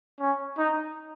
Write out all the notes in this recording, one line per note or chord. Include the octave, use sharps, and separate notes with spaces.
C#4
D#4